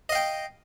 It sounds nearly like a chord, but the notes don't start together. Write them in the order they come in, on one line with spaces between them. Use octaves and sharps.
D#5 F5 G5